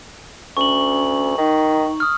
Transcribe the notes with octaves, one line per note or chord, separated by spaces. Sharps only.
D2 C#4 C#6 F#7
D#3 D#4
D#6 F6